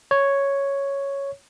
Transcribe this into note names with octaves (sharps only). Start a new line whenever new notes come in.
C#5